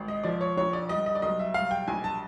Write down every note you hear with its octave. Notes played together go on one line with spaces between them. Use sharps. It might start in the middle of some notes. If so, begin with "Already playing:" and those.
Already playing: G#1
D#5
F3 D5
C#5
A#1 C#5
D5
G3 D#5
D#5
D5
B1 D#5
E5
G3 F5
G5
A#1 G#5
A5